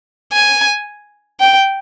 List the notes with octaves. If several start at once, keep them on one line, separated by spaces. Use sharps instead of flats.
G#5
G5